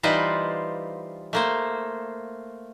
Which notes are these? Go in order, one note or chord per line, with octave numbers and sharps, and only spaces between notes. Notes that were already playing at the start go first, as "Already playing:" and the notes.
E3 G3 D#4 F4 B4 C5
A3 A#3 C5